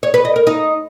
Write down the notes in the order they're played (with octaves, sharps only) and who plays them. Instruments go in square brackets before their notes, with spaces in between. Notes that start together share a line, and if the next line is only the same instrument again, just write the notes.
[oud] C#5
B4
D#5
A#4
D#4